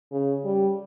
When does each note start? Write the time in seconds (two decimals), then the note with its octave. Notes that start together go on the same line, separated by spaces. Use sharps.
0.12 C#3
0.44 G3